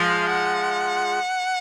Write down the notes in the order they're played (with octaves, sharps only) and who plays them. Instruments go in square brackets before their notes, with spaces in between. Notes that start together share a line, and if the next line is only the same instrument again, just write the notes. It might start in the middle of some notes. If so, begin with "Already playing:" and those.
Already playing: [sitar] F3 G#3 [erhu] F5
[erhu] F#5